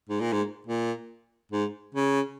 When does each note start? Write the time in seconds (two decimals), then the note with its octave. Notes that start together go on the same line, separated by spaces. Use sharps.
0.09 G#2
0.20 A#2
0.32 G#2
0.66 A#2
1.52 G#2
1.94 C#3